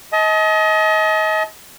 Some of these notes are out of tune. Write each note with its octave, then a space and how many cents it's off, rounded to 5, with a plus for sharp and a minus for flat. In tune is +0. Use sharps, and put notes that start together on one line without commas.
D#5 +30 A5 -35